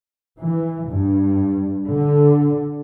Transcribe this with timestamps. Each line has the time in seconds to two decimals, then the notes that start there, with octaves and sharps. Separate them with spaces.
0.38 E3
0.88 G2
1.86 D3